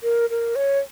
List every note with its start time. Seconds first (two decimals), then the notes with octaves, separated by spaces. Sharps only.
0.03 A#4
0.30 A#4
0.56 C#5